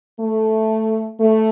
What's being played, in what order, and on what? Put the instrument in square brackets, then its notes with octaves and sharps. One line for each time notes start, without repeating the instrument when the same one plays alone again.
[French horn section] A3
A3